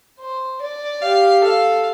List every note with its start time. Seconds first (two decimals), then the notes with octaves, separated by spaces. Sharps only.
0.20 C5
0.61 D5
1.02 G4 F5
1.42 A4 F5